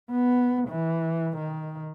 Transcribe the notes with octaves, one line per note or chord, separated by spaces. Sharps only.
B3
E3
D#3